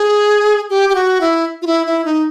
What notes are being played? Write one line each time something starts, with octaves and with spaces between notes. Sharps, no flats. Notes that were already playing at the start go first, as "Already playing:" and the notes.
Already playing: G#4
G4
G4
F#4
E4
F4
E4
E4
D#4